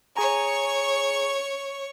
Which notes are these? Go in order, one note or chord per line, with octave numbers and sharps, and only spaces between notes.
G#4 C#5 G#5 A#5 C#6